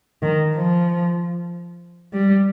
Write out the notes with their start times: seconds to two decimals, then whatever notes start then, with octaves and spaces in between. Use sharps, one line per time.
0.22 D#3
0.55 F3
2.14 G3